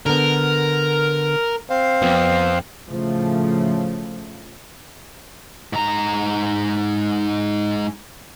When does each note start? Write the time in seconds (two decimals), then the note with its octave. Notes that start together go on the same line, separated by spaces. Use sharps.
0.06 D3 B3 A#4
1.70 C4 C5 F5
2.02 F2 B3
2.89 A2 C#3 F3 A3
5.73 G#2 A#5